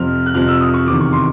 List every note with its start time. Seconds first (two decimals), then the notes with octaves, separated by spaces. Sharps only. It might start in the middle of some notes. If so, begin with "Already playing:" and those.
Already playing: F2 C3 F3 F6
0.26 F#6
0.35 F2 C3 F3 F6
0.48 E6
0.61 D#6
0.74 C#6
0.87 E2 C3 D#3 D6
1.00 C#6
1.12 C6